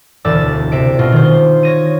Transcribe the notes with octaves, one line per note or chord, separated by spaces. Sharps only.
E1 D2 D5 E6
C3 E5 D7
B2 F4
D#3 C5
C#5 A#6 D#7